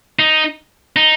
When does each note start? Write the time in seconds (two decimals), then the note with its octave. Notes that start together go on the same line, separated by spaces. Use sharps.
0.19 D#4
0.96 D#4